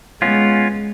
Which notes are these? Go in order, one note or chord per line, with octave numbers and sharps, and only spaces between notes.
G#3 B3 C#4 F4